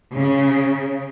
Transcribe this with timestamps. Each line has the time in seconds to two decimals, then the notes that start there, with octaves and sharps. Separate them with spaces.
0.17 C#3